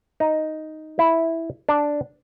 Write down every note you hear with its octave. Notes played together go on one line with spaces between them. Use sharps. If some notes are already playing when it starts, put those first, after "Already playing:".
D#4
E4
D4